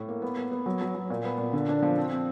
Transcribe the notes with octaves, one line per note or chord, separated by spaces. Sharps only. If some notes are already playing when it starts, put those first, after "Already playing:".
Already playing: A2
A#3
B3
B3
B3
F#3
F#3
F#3
A#2
B3
A#2
D3
D4
F3
C4
C4